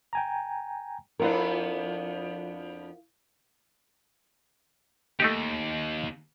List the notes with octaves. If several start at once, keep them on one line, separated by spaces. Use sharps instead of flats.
G5 G#5 A#5
F2 B3 D4 E4 F4 A#4
D#2 A3 D#4 G4